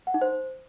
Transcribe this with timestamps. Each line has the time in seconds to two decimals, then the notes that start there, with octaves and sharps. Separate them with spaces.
0.07 F#5
0.14 D#4
0.21 C5